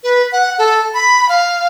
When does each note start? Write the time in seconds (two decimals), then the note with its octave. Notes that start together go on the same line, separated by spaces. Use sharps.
0.03 B4
0.32 F#5
0.58 A4
0.94 B5
1.29 F5